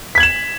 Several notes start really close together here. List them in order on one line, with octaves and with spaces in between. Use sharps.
B6 G#6 F#7 E7